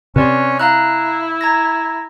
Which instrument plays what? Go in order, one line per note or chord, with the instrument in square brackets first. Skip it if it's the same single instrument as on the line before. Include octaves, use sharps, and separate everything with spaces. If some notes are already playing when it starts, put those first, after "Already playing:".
[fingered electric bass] C3 [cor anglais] C#4 [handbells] B4 D5 C6
[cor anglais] E4 [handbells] F5 A#5 F#6
[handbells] A#5 G#6 A#6